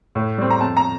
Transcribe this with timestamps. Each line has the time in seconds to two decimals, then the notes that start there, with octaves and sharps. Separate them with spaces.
0.15 A2
0.38 G3 C4
0.50 A#5
0.61 F2 A5
0.77 A#5